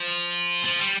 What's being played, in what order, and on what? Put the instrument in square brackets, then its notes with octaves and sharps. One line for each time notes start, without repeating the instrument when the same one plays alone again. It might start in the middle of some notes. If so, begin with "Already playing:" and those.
Already playing: [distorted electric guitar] F3
F3
G3